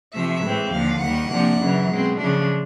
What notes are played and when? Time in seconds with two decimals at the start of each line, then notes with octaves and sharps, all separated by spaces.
0.13 C3 F3 A3 E5
0.43 A2 E3 G#3 C4
0.72 D#2 D3 F3 F5
1.01 D#2 D#3 G3 F#5
1.31 C3 F3 A#3 D4
1.59 F#2 C#3 E3
1.89 B2 G#3 C4
2.18 C#3 F3 A3 D4